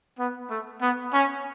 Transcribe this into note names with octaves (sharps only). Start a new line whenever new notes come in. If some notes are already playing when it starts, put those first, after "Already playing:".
B3
A3
B3
C#4